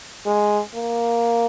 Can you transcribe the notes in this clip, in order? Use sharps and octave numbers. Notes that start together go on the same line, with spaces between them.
G#3
A#3